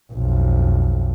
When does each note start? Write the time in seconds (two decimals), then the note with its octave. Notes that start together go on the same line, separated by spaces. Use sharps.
0.12 B1 F2